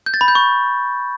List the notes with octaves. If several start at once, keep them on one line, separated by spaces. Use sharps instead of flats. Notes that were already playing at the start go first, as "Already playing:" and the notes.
G6
A6
B5
G6
C#6